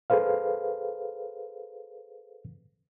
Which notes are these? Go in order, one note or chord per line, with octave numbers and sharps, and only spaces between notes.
G#4 A4 B4 C5 F5